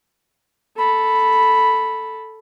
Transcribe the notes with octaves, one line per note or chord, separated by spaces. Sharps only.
A4 B5